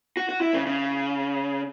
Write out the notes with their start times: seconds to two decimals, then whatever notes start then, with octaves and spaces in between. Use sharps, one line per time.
0.17 F#4
0.29 F#4
0.41 E4
0.54 C#3
0.66 C#3